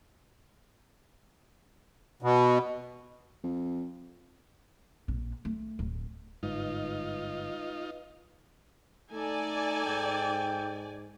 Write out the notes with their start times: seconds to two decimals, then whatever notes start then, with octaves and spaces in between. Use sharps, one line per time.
2.22 B2
3.43 F2
5.08 A#1
5.45 A3
5.79 D1
6.43 G1 G#2 D#4 F4 B4 D#5
9.12 A3 D#4 A4 D5 G#5
9.86 G#2 G5